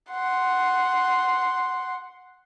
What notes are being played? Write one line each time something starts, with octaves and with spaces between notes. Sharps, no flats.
F#5 C6